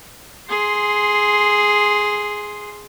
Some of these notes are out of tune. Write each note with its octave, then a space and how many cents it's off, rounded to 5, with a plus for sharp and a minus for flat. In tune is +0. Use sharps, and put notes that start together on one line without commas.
G#4 +0 C6 +0